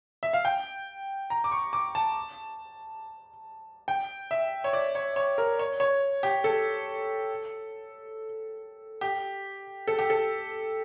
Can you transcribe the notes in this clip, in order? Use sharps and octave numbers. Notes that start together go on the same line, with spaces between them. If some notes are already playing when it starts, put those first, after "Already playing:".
E5
F5
G5
A#5
D6
C#6
D6
A5
G5
E5
C#5
D5
C#5
C#5
A#4
C#5
C#5
G4
A4
G4
A4
G4
A4